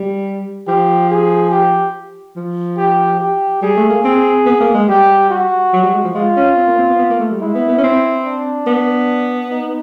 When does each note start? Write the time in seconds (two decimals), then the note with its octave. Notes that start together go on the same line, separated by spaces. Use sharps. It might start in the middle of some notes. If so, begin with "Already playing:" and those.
Already playing: G3
0.67 F3 G4
1.10 G#4
1.51 G4
2.36 F3
2.77 G4
3.20 G4
3.62 G3 G#4
3.77 A3
3.90 A#3
4.04 C4 G#4
4.46 B3
4.61 A#3
4.75 G#3
4.89 G3 G4
5.30 F#4
5.73 F#3
5.83 G3
5.93 G#3
6.04 F3
6.15 G#3 F4
6.37 C#4
6.57 C4
6.67 A#3
6.78 C4
6.88 B3
6.98 B3
7.10 A#3
7.20 A3
7.31 G3
7.41 G#3 E4
7.55 B3
7.69 B3
7.78 C#4
7.84 C4
8.25 D4
8.67 B3
9.51 D#4